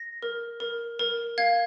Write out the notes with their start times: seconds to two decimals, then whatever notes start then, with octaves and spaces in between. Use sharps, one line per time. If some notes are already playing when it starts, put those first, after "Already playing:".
Already playing: A#6
0.22 A#4
0.60 A#4
0.99 A#4
1.38 F5 G#6